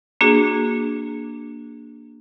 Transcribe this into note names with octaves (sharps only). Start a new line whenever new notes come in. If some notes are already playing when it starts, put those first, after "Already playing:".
A#3 D4 F#4 G#4